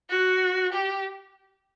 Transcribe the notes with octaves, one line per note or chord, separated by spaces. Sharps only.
F#4
G4